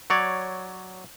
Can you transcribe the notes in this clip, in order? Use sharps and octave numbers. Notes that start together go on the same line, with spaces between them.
F#3 C#5 D5